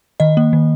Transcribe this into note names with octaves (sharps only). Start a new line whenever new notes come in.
D#3 D#5
A#3
D#3